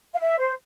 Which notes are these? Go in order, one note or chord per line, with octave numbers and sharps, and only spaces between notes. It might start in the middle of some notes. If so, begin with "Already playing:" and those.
F5
E5
C5